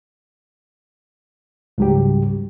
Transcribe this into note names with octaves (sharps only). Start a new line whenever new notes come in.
C#2 G#2 F#3 G3 G4